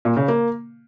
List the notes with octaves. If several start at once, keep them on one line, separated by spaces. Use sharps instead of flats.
A#2
C#3
A#3